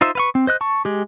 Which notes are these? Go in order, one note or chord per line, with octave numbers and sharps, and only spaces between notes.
D#4 F4 C5 E5
B4 F5 C#6
C4
C5 D#5 F#6
A5 C#6
G#3 G4